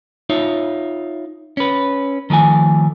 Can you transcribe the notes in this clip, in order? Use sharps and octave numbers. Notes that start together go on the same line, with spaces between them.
D#4 F4 C#5 E5
C#4 B4
D#3 F3 A3 G#5